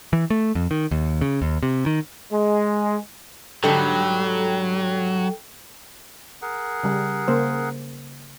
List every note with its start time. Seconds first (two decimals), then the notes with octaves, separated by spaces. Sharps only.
0.13 E3
0.30 A3
0.55 F2
0.71 D#3
0.91 D#2
1.21 C#3
1.42 D#2
1.63 C3
1.86 D#3
2.31 G#3
3.64 G#2 D3 F#3 G3 A4 G5
6.42 G#4 A#4 F#5
6.83 C#3 G3 G4
7.28 C#3 A#3 C5